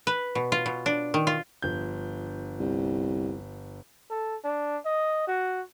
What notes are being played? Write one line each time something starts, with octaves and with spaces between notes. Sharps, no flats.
B4
B2
F4
B2
D4
D#3
F4
G1 F3 G6
C2
A4
D4
D#5
F#4